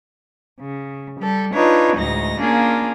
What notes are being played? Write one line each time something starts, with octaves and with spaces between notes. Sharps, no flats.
C#3
G3 A4
D4 D#4 F4 B4 C#5
D2 A2 G#3 D#4 A#6
A#3 C#4 D4 F4 G#4